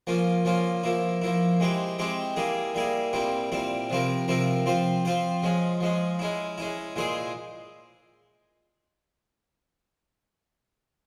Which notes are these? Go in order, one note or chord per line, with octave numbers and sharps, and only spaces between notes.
F3 A#3 C#4 F4
F3 A#3 C#4 F4
F3 A#3 E4
F3 A#3 E4
G#3 C4 E4 G4
G#3 C4 E4 G4
G3 A#3 E4 G#4
G3 A#3 E4 G#4
A#2 G3 C4 E4
A#2 G3 C4 E4
C3 F3 C4 E4 A#4
C3 F3 C4 E4 A#4
F3 C4 F4 C5
F3 C4 F4 C5
F3 G#3 C#4
F3 G#3 C#4
G#3 C#4 E4
G#3 C#4 E4
A#2 G#3 E4 G#4 C5